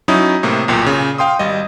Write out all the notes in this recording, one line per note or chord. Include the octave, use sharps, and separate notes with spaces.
F#3 C#4 D#4 E4 D#6
A2 C3 A#3
B1 E2 A#2 G5
A#2 C#3
F5 G5 C6 D#6
G#1 G3 D#5